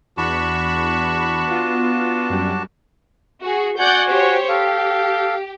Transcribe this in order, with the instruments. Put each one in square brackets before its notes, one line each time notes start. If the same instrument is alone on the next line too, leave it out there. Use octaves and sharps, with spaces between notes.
[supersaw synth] E2 B5 C#6 [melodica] D4 F#4 A5
[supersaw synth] B3 F4
F#2 G3
[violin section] F#4 G#4
[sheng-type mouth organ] F#4 G#5 [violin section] D5 F#5 G6
[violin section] G4 C5 C#5
[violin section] G4 [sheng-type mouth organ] A4 F5